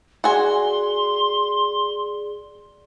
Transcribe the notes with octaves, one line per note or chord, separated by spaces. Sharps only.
F#4 G#4 D5 G#5 C6